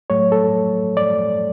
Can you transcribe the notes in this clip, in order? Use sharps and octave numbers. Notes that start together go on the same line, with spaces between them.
A2 F#3 A3 C#5
A4
D5